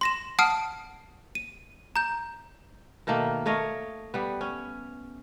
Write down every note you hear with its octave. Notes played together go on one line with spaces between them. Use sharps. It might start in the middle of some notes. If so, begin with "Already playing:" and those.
C6 A#6 E7
F#5 A5 D#6 F6 C7 D7
D#7
A#5 G6
B2 D#3 A3 A#3
A3 C#5 D#5 F5
G3 B3
C#4